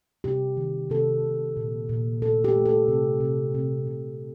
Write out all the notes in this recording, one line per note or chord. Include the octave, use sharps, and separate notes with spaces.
C3 G4
D#3
C3 A4
C3
A#2
A#2
A#2 A4
G4
A3
A4
C3
C3
C3
C3